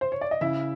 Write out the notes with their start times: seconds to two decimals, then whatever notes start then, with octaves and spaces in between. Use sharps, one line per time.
0.01 C5
0.12 C#5
0.21 D5
0.31 D#5
0.41 C#3 E4 E5